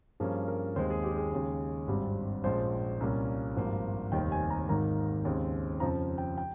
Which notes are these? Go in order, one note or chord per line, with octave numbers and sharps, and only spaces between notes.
G2 F3 A#3 C#4 G#4
A#4
D#2 D#3 G#3 C4 C5
G#4
G4
G#4
D#2 C#3 G#3
G#1 G2 G3 C4
A#1 A#2 F3 G#3 C#4 C5
C2 A#2 G3 A#3 C#4
G#1 G2 F3 A#3
F1 D#2 D#3 G3 C4 G5
G#5
A#5
G#1 G#2 D#3 A#3 A#5
D#2 C#3 G#3 C4
F2 C#3 F3 A#5
G5
G5